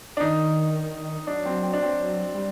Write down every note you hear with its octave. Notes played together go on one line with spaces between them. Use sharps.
D4
D#3 D#4
F#3 D4
C4
C4
D4
C4
G3